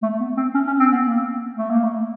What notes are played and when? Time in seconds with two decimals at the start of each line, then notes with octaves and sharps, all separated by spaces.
0.03 A3
0.20 B3
0.37 C4
0.54 C#4
0.67 C#4
0.80 C4
0.92 B3
1.05 A#3
1.57 A3
1.70 A#3
1.84 A3